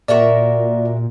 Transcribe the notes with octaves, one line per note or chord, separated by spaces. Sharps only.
A#2 F#4 A#4 D5 E5